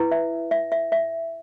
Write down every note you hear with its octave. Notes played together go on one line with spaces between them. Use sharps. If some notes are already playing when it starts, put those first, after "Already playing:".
Already playing: E4 B4
E5
E5
E5
E5